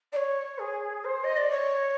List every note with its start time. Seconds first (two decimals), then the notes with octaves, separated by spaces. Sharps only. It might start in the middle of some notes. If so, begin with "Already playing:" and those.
0.12 D5
0.16 C#5
0.58 G#4
1.04 C5
1.24 D#5
1.36 D5
1.50 C#5